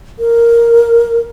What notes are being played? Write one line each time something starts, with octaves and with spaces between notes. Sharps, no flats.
A#4